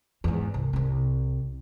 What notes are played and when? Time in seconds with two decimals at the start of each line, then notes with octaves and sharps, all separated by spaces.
0.24 E2 G#2
0.54 C2
0.73 C2 C4